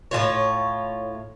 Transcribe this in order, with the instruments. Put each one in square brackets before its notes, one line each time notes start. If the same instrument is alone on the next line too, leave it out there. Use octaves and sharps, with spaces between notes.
[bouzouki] A2 F#3 F4 C#5